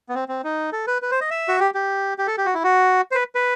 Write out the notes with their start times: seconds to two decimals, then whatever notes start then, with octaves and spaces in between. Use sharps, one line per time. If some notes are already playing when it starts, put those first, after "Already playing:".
0.09 B3
0.15 C4
0.28 C4
0.44 D#4
0.73 A4
0.87 B4
1.02 B4
1.11 C5
1.21 D#5
1.30 E5
1.48 F#4
1.60 G4
1.74 G4
2.18 G4
2.27 A4
2.38 G4
2.46 F#4
2.54 E4
2.64 F#4
3.11 C5
3.15 B4
3.35 B4